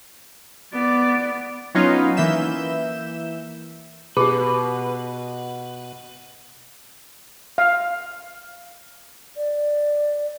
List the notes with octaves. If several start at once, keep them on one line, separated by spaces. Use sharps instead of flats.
B3 D5
F#3 B3 C#4 D#4 F4
E3 A#3 E5 G6 E7
B2 G4 G#4 B4
F5
D5